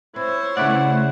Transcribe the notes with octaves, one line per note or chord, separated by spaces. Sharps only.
C4 E4 C5 C#5
C#3 A3 B3 E4 D5 F#5